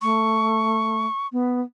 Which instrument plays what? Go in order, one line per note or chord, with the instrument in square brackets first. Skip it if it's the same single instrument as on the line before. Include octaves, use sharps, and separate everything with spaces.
[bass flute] A3 [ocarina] C#6
[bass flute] B3